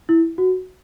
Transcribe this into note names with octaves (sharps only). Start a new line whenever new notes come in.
E4
F#4